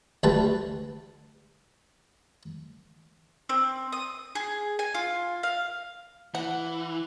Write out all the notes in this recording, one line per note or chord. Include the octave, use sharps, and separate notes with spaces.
D2 G3 A3 B4 A5
C4
D#6
G#4
G#5
F4
F5
E3 F#5